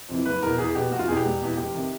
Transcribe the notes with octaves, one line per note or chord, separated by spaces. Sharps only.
F2 C3 E3
F#1 B4
E2 B2 A#4
E2 G#4
B2 G4
F1 F#4
F4
E2 B2 G4 G#4
E1
E2 B2
F1 G4
C3 D#3